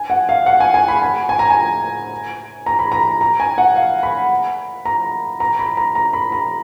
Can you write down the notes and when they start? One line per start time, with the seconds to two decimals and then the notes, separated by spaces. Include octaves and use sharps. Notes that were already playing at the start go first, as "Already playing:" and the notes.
Already playing: G#5
0.10 F#5
0.29 F5
0.46 F#5
0.60 G#5
0.74 G#5
0.88 B5
1.02 G#5
1.29 G#5
1.39 A#5
1.50 G#5
2.66 A#5
2.79 B5
2.92 A#5
3.21 A#5
3.40 G#5
3.58 F#5
3.76 F5
4.03 B5
4.85 A#5
5.40 A#5
5.59 B5
5.77 A#5
5.95 A#5
6.13 B5
6.32 A#5